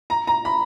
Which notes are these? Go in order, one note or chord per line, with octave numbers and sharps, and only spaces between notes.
A#5
A#5
B5